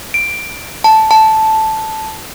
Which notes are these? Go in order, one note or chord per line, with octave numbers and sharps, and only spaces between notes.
D7
A5
A5